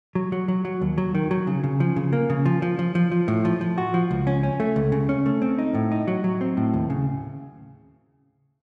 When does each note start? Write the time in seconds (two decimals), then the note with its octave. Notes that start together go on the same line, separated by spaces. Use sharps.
0.15 F#3
0.32 F#3
0.48 F#3
0.65 F#3
0.81 D#2
0.98 F#3
1.15 D#3
1.31 F#3
1.47 C#3
1.64 C#3
1.80 F3
1.96 C#3
2.13 A#3
2.30 C#3
2.46 F3
2.62 F3
2.79 F3
2.95 F3
3.11 F3
3.28 A2
3.45 F3
3.61 F3
3.78 F#4
3.94 F3
4.11 C#2
4.27 C#4
4.43 C#4
4.60 A3
4.76 C#2
4.92 C#3
5.09 C#4
5.26 A3
5.42 C4
5.58 D#4
5.75 A2
5.92 D#4
6.08 F#3
6.24 F#3
6.41 C4
6.57 A2
6.74 D#2
6.90 C#3